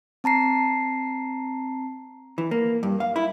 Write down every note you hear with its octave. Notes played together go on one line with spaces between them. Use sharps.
C4 A5 A#5 C7
E3
A#3
G2
F5
E4